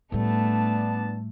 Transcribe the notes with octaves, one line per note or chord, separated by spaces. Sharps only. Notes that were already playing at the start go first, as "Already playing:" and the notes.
A2 G3 A3 B3 D4 A5